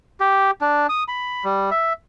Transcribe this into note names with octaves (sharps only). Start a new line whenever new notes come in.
G4
D4
D#6
B5
G3
E5